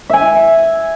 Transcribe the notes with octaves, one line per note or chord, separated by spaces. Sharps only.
E5 G#5